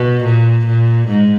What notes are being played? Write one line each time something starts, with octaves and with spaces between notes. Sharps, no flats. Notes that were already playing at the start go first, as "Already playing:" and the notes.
Already playing: B2
A#2
A#2
G#2